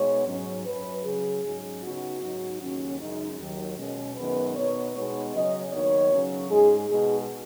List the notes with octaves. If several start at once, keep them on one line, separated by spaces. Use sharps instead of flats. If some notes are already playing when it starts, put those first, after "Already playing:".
Already playing: B2 G#3 B3 D#4 C#5
G#2 F#3 C#4
F#2 F#3 C#4 B4
C#3 F#3 C#4 G#4
G#2 F#3 C#4
C#3 B3 D#4 F#4
G#2 F#3 D#4
D#2 C#3 F#3 C#4
F#2 C#3 G#3 D#4
D#2 D#3 F#3
B2 G#3 C#4
F#2 D#3 G#3 B3 B4
B2 B3 D#4 C#5
B2 G#3 B3 D#4 C#5
C#3 F#3 C#4 D#5
D#2 D#3 F#3 B3 C#5
C#3 F#3 C#4
G#2 G#3 D#4 G#4
B2 G#3 D#4 G#4